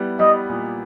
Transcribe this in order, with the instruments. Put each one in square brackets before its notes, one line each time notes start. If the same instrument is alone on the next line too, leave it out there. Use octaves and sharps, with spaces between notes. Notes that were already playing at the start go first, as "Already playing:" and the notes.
Already playing: [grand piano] G3 B3 E4
[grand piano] G3 [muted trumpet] D#5
[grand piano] A#2